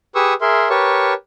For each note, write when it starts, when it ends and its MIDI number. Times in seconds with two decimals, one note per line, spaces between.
0.15 0.34 67
0.15 0.34 68
0.15 0.34 71
0.15 0.34 85
0.15 0.34 87
0.15 0.34 88
0.41 0.69 68
0.41 0.69 70
0.41 0.69 76
0.41 0.69 84
0.70 1.14 67
0.70 1.14 70
0.70 1.14 71
0.70 1.14 73
0.70 1.14 81
0.70 1.14 85